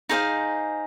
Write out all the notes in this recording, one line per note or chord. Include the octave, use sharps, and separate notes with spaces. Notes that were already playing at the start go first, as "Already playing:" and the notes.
D#4 G#4 C5 F5